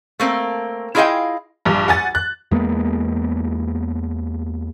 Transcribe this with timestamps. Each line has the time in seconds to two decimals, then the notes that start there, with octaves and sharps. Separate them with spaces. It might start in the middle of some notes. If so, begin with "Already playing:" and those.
0.20 A3 A#3 C4
0.95 E4 F4 G#4 D#5 F5 G5
1.65 A#1 G2
1.88 F#5 G#5 A6
2.15 F#6
2.51 E2 G#3 A#3 B3